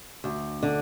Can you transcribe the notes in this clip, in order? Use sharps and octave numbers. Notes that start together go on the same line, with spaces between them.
D2
D3